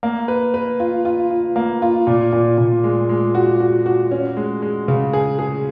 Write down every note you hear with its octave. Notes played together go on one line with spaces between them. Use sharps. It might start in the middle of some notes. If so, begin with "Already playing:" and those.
A#3
B4
B4
F4
F4
F4
A#3
F4
A#2
A#2
A#2
G#3
G#3
F#4
F#4
F#4
C#4
G#3
G#3
C#3
G#4
G#4